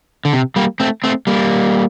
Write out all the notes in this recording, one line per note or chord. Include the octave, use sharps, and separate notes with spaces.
D3
C3
G3 A#3
A3 C4
A3 C4
G3 A#3